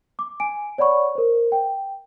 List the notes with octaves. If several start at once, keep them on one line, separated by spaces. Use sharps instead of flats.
D6
G#5 D7
C#5 D5 F#5 B5 C#6
A#4 C5
G5